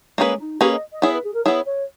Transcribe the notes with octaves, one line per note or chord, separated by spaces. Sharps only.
G#3 A#3 C#4 G#4 B4
D#4
A#3 C#4 G4 G#4 B4
D#5
D#5
B3 E4 G#4 C#5
B4
G#4
A#4
B3 E4 G#4 C#5
C#5